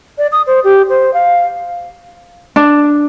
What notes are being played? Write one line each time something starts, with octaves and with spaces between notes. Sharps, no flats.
D5
D#6
C5
G4
C5
F5
D4